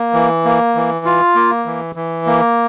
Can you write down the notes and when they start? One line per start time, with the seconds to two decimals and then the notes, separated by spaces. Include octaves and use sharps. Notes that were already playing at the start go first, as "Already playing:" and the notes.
Already playing: A#3
0.14 E3
0.45 A#3
0.75 E3
1.05 F4
1.35 A#3
1.66 E3
1.95 E3
2.26 A#3